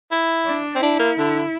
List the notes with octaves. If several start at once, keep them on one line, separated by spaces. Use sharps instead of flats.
E4
D4
C4
D4 E4
A#3
D3